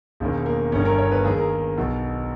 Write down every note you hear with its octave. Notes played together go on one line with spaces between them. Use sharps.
E1 D#2 D#3
A#3
G1 G2 D#3 C#4
A#4
C#5
B4
D#2 D#3 G#4
A#4
G#4
B1 B2